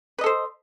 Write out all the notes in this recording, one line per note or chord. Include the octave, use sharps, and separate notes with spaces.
A4 B4 C5 D#5